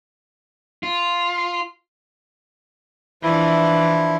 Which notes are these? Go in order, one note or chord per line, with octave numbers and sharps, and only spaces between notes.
F4
E3 F3 D4 E4